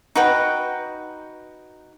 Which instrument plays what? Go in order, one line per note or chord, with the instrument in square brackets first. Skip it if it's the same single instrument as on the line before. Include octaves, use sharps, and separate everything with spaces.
[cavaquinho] D#4 F#4 B4 G5